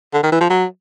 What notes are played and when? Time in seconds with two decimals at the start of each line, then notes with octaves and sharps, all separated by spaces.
0.14 D3
0.23 D#3
0.32 E3
0.41 F3
0.50 F#3